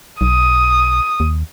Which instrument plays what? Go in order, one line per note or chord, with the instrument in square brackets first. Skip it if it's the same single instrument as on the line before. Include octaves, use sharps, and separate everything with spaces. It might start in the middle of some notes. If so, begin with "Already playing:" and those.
[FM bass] B1 [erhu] D#6
[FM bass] D#2